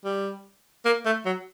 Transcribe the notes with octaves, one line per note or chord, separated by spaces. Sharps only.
G3
A#3
A3
F#3